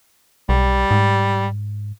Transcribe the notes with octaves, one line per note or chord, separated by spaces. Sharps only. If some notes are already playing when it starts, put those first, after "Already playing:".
B1 G3
G#2